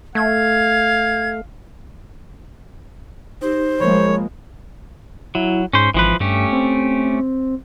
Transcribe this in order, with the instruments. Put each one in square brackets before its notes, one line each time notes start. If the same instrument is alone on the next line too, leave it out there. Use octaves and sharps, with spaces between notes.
[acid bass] A3 [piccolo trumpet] F5 [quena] G#6
[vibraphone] D#4 G4 [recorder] C5
[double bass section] F3 G#3 A#3 [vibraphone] A#4 B5 [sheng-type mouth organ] C#5
[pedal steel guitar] F#3 [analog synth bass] E4
[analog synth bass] G#2 [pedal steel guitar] C#4 C5
[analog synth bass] G#1 [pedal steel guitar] E3 F3 B4
[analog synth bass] G2 [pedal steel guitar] A3 C#4 G4
[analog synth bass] C4